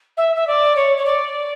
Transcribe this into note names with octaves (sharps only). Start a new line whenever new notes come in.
E5
E5
D5
C#5
C#5
D5